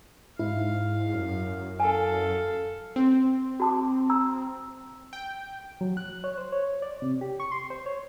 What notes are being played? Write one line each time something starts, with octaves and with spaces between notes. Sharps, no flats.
G#2 E4 F5
F#2
A4 F5 G#5
C4
F#4 A5 D6
A#5 E6
G5
F#3
F#6
C#5
C5
C#5
D5
C3
G4
C#6
C6
C5
C#5